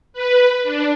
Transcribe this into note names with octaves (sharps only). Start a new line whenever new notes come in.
B4
D4